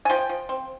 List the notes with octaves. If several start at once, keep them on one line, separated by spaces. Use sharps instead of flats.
G#5
F3 G5
F3
C4